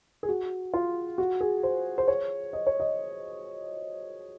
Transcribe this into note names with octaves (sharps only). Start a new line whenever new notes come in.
G#4
F#4
F4
F#4
G#4
C5
C5
C#5
D#5
C#5
D#5